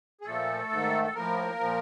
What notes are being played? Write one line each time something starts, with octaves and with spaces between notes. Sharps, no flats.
G#4
A#2 F3 A3 A4
G#2 D#3
A4
A2 F3 A#3 A#4
A#2 F3